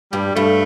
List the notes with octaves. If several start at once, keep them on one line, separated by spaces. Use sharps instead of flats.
G2 G3
G2 A3